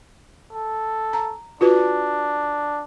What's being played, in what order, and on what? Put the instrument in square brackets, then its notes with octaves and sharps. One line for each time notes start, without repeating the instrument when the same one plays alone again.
[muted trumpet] A4
[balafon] A#5
[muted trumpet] D4 [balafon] F4 F#4 B4